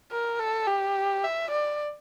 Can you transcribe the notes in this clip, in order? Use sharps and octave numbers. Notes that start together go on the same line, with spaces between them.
A#4
A4
G4
E5
D5